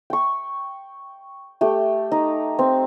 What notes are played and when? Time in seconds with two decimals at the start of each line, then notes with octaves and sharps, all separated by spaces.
0.10 G5 C#6
1.61 A3 G4 G5
2.12 D#4
2.59 C4